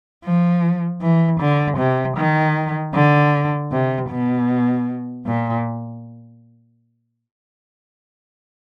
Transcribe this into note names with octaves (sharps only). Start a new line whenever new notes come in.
F3
E3
D3
C3
D#3
D3
C3
B2
A#2